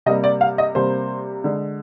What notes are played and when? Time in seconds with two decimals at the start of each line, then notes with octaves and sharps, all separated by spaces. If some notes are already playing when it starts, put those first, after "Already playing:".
0.06 C3 G3 A#3 D#5
0.24 D5
0.41 F5
0.58 D#5
0.75 C3 G3 A#3 C5
1.44 D3 G#3